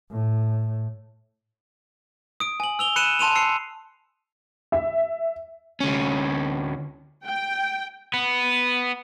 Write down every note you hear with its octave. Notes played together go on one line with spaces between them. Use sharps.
A2
D#6 D7
G#5 F#7
E6 F7 G7
B5 F#6 C#7 D#7 E7
A5 C6 D#7 F7
E6 C7 C#7
E5
D2 C#4
G5
B3